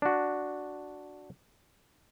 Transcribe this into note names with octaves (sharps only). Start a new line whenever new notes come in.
D4 F#4